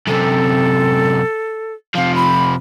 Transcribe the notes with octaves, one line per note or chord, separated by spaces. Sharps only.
F#2 C3 A4
C3 F3 F5
B5